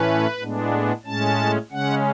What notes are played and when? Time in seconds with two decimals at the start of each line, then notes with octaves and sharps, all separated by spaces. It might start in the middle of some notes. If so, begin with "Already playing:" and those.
Already playing: A2 E3 A3 C#4 B4
0.39 A2 G#3 B3 D4
1.05 A2 G#3 C#4 A5
1.71 C#3 G#3 C#4 F#5